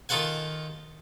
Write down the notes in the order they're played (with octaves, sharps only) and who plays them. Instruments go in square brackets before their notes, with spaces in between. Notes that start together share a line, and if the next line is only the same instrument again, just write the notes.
[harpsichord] D#3 F4 A4 F#5 G#5